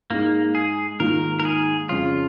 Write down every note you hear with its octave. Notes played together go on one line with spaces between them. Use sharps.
G#2 G#3 A#3 D#4
G#4
G#2 D#3 A#3 F4 A#4
A#4
G#4
F2 C#3 F3 C#4 F4